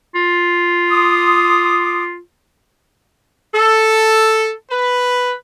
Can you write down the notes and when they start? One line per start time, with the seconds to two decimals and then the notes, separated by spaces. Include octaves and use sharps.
0.15 F4
0.89 C6 D6 D#6
3.54 A4
4.71 B4